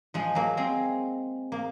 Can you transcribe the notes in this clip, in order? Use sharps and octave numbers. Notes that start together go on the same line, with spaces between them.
F3 G#3
F#3 A#3
G#3 C4
A#3